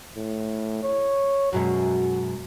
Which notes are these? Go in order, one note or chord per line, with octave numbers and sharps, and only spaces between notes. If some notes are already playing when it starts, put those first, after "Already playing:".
A2
C#5
F#2 B2 G#3 F#4